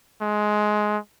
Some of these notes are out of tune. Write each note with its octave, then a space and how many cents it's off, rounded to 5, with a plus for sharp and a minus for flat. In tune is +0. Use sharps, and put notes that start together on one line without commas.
G#3 +15